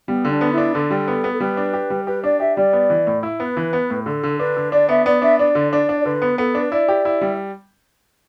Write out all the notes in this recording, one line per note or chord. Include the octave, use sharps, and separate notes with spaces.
G3 B3
D3
D4
B3
E4
D4
D3 A4
G3
B3
B3
A4
G3 B4
D4
G4
G3
G4 B4
D4 D5
G4 E5
G3 D5
B3
E3
A2
E4
B3 B4
E3
B3
A2
D3 A4
D3
D4 B4
D3
D4 D5
B3 E5
B3 D5
D4 E5
D4 D5
D3
D4 D5
D4
D5
D3 B4
B3
B3 A4
D4
B4
E4 D5
G4
E4
G3